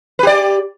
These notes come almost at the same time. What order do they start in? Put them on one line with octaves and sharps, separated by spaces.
B4 G4 D5